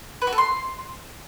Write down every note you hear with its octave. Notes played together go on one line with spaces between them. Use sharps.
B4
F#4
A4
C6